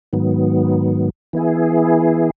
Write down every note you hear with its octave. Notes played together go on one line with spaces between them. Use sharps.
G#2 D#3 F#3 B3
E3 B3 E4 G#4